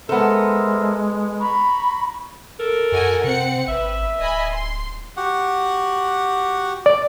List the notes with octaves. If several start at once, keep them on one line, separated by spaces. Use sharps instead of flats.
G#3 B3 A4 A#4 C5 E5
A#5 B5 C#6
A4 A#4
F#2 F#4 D#5 G#5
C3 C4 F#5 C#7
G#1 B4 E5
D1 D#5 G#5 B5
C6
F#4 G4 F#5
D5